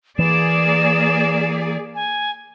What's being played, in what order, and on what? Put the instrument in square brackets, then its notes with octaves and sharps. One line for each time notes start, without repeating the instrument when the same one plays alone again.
[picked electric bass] E3 [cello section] A#3 G#4 D5 [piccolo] E7
[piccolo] G#5